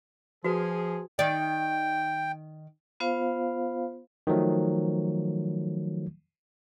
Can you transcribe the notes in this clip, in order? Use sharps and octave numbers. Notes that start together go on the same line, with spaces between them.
F3 F#4 G#4 B4
D#3 D5 G5
B3 F4 C5 F5
D#3 F3 F#3 A3